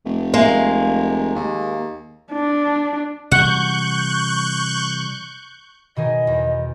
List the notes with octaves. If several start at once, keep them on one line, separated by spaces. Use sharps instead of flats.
F1
G#3 A#3
D#2
D4
C3 E3 G3 F#5 C#6 F#6 G6
B2 D#3 G#4 D#5
E2